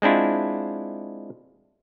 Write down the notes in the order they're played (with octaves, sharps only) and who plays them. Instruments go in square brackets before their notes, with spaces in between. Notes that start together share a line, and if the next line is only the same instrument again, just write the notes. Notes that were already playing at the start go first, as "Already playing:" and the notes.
[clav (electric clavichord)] G#3 C4 D4 E4 F4